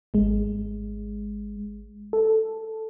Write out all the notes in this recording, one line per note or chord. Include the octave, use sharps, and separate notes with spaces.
G#1 G#3
A4